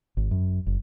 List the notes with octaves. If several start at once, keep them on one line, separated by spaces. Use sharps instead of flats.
G#1
F#2
F#1